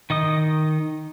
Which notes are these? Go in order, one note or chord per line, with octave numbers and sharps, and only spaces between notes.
D#3 D#5 D#6